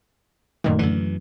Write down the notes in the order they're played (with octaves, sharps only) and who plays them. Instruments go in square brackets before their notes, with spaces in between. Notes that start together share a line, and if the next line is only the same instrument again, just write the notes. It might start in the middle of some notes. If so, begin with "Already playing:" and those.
[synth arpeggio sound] F#2 A#2 D#3 [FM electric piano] A3
[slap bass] F#2 E3 [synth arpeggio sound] D3